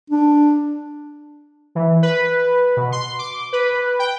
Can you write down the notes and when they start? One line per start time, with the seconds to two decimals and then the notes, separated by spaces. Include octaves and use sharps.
0.10 D4
1.75 E3
2.02 B4
2.77 B2
2.92 C6
3.19 D6
3.53 B4
3.99 G5